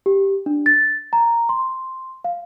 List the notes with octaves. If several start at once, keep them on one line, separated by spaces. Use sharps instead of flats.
G4
D4
A6
A#5
C6
F5